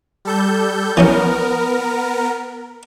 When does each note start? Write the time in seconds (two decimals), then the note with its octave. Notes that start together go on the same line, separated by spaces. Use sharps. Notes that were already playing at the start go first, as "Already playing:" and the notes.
0.25 G3 A4 G6
0.97 E3 F#3 B3 C#4 A#4